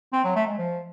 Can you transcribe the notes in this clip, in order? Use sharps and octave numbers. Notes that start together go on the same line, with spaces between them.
C4
F#3
A3
G#3
F3